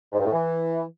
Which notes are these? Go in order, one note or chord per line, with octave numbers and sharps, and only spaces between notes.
G#2
G2
A2
E3